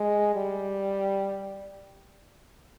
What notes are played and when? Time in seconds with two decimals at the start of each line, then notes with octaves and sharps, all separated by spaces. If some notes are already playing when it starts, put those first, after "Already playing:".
Already playing: G#3
0.36 G3